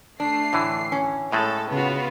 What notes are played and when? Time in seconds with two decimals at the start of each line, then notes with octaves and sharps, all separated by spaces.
0.20 A3 D4 C7
0.53 A2 D3 E3
0.92 C#4
1.32 A2 G#3 A3 A4
1.71 C#3 B3 F4 F#4